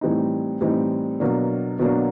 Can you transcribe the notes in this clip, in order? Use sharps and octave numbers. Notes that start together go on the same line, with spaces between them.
A2 E3 G3 C4 D#4
A2 E3 G3 C4 D#4
B2 F#3 A#3 D4
B2 F#3 A#3 D4